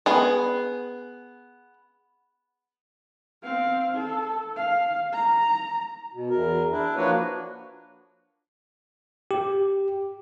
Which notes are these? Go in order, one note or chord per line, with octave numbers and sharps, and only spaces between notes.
B3 G#4
C4 F5
A4
F5
A#5
B2
E2 A#4
D4 E4
F3 A#3 D4 F#4 B4 C#5
G4